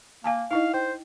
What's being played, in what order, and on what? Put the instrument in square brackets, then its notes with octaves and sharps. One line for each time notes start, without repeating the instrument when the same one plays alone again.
[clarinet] A#3 [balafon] F5 G#5 A5
[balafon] D#4 E4 D#5 [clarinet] F5
[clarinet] C5 [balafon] G5